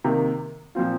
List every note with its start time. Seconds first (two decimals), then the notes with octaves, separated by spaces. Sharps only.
0.04 C3 D#3 A#3
0.75 A#2 F3 C4 F4